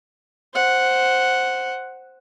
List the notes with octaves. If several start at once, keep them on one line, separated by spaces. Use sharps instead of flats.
C5 F#5